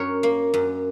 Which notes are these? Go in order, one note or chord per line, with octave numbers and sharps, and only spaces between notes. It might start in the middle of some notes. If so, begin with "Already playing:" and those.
Already playing: F#2 A#4 C#5
A#3
F#2